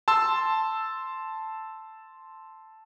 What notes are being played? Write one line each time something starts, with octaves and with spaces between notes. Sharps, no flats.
A5 C6 E6